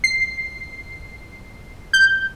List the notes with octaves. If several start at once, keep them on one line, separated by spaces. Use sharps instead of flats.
C7
G6